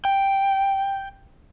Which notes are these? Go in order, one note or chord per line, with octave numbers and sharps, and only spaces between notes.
G5